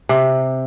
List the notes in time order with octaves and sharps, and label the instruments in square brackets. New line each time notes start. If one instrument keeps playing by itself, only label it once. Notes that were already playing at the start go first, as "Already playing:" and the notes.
[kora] C3